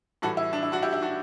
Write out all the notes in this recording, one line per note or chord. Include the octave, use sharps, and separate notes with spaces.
A2 E3 G3 F#4 A4
E4
D4
E4
D4 F#4
E4 G4
E4 G4
D4 F#4